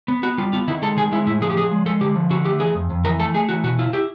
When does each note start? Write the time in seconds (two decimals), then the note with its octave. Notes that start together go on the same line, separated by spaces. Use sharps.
0.08 B3
0.23 B3 F#4
0.38 G3 F4
0.53 B3 F4
0.68 D#3 E4
0.82 G#3 A4
0.97 D#3 G#4
1.12 G#3 E4
1.27 A2 E4
1.41 F3 G#4
1.50 G4
1.57 F3 G#4
1.71 G#3
1.86 G#3 A4
2.01 D3 G4
2.16 F3
2.30 D3 F#4
2.45 A3 G4
2.60 E3 G#4
2.75 F2
2.90 F2
3.05 E3 A#4
3.19 A3 A4
3.34 A3 G#4
3.49 E3 F#4
3.64 B2 F#4
3.79 E4 F4
3.93 E4 G4